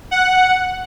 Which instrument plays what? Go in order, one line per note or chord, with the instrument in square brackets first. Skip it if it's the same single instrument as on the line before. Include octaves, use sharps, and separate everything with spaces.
[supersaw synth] F#5